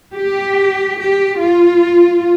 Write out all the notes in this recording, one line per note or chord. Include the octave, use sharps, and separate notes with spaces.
G4
G4
F4